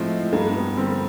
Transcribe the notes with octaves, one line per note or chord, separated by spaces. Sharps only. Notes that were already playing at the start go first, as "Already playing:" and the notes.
Already playing: A2 F3 G#3 A3 C4 E4
G2 A#3
B3
D3 G3 A#3 C4